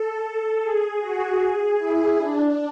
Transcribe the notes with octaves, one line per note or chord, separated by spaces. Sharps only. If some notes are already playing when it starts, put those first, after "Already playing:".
Already playing: A4
G#4
F#4
G#4
E4
D4